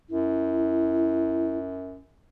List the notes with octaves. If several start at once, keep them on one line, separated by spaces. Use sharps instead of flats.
F#2 E4